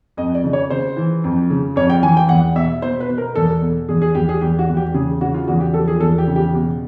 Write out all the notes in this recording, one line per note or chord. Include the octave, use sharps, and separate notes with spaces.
F2 D#5
D5
C#3
C#5
C#3 C5
E3
F2
C#3
F2 C#5
G5
E3 G#5
G5
E2 F#5
B2 E5
B2 C5
B4
B2
A#4
E2 A4
B2
E2 G#4
G#4
E2 G4
G#4
E2 G4
F#4
E2
G4
C#3 G#4
C#3 F#4
F4
E2 F#4
G4
F3 A4
G#4
E2 A4
G4
C#3
G4
B2